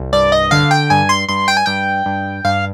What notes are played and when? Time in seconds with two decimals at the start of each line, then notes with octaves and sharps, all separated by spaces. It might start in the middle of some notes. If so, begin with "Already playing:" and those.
Already playing: C2
0.12 G2 D5
0.32 D#5
0.51 D3 F5
0.71 G5
0.90 G2 G#5
1.09 C6
1.29 G2 C6
1.48 G5
1.57 G#5
1.66 G2 G5
2.06 G2
2.44 G2 F5